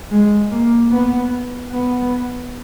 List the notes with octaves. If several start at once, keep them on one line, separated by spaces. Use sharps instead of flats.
G#3
A#3
B3
B3